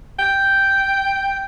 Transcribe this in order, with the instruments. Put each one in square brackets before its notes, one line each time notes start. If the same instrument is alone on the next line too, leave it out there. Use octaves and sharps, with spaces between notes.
[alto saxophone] G5